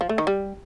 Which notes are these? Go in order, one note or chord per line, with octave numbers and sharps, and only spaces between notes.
F3
A3
D#3
G3